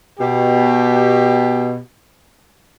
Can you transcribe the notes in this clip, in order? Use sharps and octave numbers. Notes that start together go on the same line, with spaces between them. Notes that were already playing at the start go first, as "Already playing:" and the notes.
B2 G4